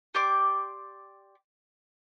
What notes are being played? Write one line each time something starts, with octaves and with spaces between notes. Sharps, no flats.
G4 D5 C6 D6